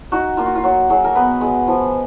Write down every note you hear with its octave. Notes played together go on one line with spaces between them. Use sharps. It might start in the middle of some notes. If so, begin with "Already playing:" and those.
D#4 F#4
A#3 F4
F#4
F4
F#3 F#4
F#3 G#4
A#4
B3 B4
G#3
F3